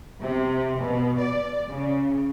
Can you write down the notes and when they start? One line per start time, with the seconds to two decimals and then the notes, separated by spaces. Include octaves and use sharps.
0.21 C3
0.80 B2
1.19 D5
1.67 C#3